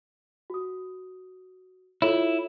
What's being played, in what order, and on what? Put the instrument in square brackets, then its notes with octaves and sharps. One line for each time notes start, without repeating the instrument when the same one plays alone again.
[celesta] F#4 D#6
[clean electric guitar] E4 [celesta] F4 A4 C#5